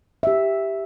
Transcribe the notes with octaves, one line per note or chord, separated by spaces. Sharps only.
G4 E5